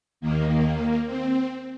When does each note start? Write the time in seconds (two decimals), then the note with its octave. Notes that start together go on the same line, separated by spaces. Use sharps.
0.21 D#2 D#3 A#3
1.06 C4